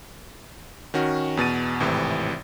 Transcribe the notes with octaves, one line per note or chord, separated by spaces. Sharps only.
D#3 C#4 F#4
E2 B2 A6 D#7
G#1 A2 C3 E3